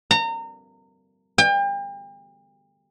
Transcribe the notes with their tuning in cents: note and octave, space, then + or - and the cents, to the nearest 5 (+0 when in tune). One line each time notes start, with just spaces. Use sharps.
A#5 -30
G5 +35